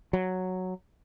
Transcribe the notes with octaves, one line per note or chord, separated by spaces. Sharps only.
F#3